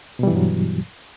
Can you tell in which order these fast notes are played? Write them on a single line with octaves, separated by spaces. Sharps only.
B2 G3 E3 G2 F#3